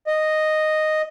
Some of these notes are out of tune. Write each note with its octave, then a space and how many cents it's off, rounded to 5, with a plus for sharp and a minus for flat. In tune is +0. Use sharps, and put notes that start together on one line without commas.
D#5 -5